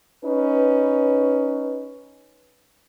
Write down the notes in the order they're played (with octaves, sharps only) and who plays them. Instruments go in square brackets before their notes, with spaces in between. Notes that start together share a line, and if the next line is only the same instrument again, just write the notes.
[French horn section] C#4 D#4 B4